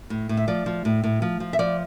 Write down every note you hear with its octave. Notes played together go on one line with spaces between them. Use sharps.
A2
A2
E5
F3 D5
F3
A2
A2
F3
F3
E5
F3 D5